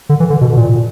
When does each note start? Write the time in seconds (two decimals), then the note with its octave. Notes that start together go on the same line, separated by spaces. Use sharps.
0.09 D3
0.20 E3
0.30 D3
0.41 B2
0.57 A#2